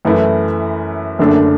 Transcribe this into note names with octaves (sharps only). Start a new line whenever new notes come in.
F#2 E3 A3 E4
F#1 F#2 D3 A3 D4